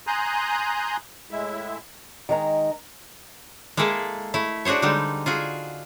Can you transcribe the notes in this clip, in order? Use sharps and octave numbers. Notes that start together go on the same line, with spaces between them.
G#5 A#5 C6 D#6 F#6 G6
A2 G#3 E4 E5
D#3 G#3 A#5
G#3 A#3 E4 G#4 A4
A3 E4
D4 F#4 G#4 C5 C#5
D3 G3 G#3 D#4
F4 F#4 G#4